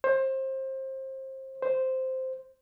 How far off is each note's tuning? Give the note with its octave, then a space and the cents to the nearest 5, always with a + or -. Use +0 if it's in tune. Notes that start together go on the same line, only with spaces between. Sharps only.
C5 +25
C5 -5